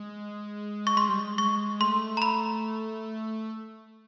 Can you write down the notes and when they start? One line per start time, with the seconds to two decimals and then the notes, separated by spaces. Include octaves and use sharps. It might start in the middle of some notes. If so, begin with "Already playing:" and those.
Already playing: G#3
0.87 C#6
0.96 G#3 C6
1.09 G3
1.20 G#3
1.38 G#3 C#6
1.80 A3 C6
2.17 A#5
2.22 B5